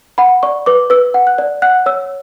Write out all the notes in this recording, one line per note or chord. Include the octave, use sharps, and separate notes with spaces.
F#5 B5
D5 C#6
B4 D6
B4 E6
F#5
F#6
D5
F#5 F#6
C#5 E6